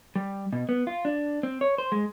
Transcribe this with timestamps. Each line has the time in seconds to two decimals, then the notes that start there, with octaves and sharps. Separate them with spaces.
0.16 G3
0.53 B2
0.69 B3
0.87 F4
1.05 D4
1.43 C4
1.61 C#5
1.78 C5
1.92 G#3